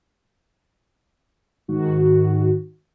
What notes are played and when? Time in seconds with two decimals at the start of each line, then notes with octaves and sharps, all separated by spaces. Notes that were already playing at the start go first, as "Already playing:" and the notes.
1.68 G#2 D#3 F#4